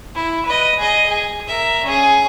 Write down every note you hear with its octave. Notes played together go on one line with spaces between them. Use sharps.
E4
B4 D#5
G#4 D#5
G#4
A#4 E5
C#4 G#4